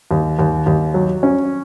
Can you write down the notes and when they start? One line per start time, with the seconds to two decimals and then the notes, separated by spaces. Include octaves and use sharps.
0.11 D#2
0.39 D#2
0.66 D#2
0.94 F#3
1.23 C#4